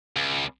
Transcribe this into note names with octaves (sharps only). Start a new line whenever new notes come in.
C#2